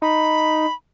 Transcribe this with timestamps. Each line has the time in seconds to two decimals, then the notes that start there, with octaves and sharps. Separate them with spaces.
0.02 D#4 B5